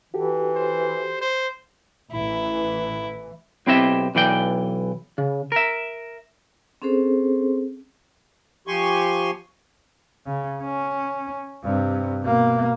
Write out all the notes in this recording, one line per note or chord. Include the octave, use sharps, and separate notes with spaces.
E3 F#4 G4 A4
C5
C5
A1 E3 E4
B1 C4 E4 G4 D#5 E5
B1 E3 D5 G5
C#3
A#4 E5
C4 C#4 G#4 A4 C5
F3 G4 G#5 C6 C#6
C#3
C#4
G2 C3
B2 A#3